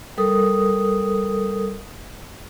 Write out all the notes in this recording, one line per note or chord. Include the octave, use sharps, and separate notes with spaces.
G3 A4 A#4 D#6